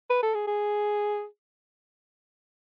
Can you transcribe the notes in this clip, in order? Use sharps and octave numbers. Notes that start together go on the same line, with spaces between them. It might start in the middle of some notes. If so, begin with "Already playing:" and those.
B4
A4
G#4
G#4